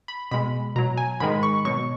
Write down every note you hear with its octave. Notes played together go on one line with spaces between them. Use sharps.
B5
B2 G#3 B5
B2 F#3 A#5
G#5
G#2 D#3 G#3 B5
C#6
B2 F#3 C#6